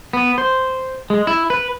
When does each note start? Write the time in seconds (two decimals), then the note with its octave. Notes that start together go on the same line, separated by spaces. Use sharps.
0.13 B3
0.38 C5
1.10 G#3
1.27 E4
1.50 B4